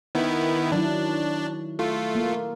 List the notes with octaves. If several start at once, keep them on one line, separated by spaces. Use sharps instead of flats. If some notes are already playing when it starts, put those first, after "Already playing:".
D#3 B3 E4
D#3 F#3 D4 E4
A3 F4
A#3